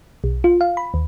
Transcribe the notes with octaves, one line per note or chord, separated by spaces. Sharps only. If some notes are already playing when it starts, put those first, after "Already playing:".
B1
F4
F5
B5
D#2